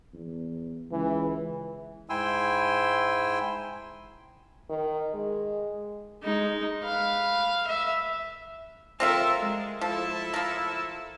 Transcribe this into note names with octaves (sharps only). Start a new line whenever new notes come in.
E2
C#2 E3
G#2 E4 G5 G#5 C6 E6
D#3
G#3
G#3 D#4
B4 F5
E5
C4 F4 A4 A#4 E5
G#3
F3 E4 A4
F3 A#4